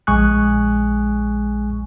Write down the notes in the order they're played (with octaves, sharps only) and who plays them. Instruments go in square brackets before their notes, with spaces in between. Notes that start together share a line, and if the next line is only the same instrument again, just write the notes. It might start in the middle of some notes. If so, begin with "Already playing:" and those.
[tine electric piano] A#1 G#3 G#5 C#6 D#6 F#6